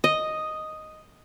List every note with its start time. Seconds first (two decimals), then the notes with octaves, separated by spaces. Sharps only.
0.04 D#5